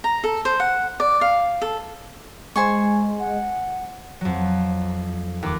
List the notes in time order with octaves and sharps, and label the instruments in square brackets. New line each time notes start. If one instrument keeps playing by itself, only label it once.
[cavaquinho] A#5
A4
C5
F#5
D5
F5
A4
[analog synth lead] G#3 [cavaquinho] C5 G#5 C#6
[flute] F#5
[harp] F2 F#3
D#2 D6